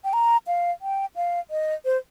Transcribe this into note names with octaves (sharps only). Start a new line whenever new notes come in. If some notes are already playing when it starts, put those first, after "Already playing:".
G5
A#5
F5
G5
F5
D#5
C5